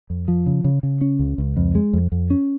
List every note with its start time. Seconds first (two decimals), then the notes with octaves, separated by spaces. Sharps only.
0.10 F2
0.28 F3
0.46 C#3
0.64 C#3
0.83 C#3
1.01 C#4
1.19 C#2
1.38 C#2
1.57 F2
1.75 G#3
1.93 F2
2.12 F2
2.30 C#4